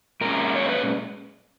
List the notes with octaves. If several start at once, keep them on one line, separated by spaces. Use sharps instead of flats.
A#2 G#3 C#4 A#4
C#5
B4